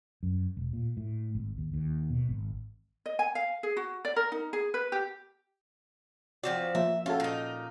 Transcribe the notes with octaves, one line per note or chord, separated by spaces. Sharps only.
F#2
E1
A#2
A2
G#1
D#2
D#2
B2
G#1
D#5
G#5
F5
G#4
F#4
D5
A#4
D#4
G#4
B4
G4
F3 C4 F#4 D5
F3 A#3 E5
C#4 F4 F#4 A4
A#2 D#4